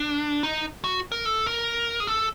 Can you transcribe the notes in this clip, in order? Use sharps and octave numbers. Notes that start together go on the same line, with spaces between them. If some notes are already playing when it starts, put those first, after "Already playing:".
Already playing: D4
D#4
F#4
A#4
A4
A#4
G#4
A4